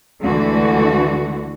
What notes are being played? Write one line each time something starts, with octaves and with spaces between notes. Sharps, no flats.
D2 D3 E3 G#3 F#4